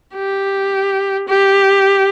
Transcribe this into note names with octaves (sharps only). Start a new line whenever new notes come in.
G4
G4